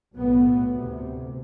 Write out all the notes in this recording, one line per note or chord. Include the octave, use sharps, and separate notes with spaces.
B1 A2 B3
D2 C3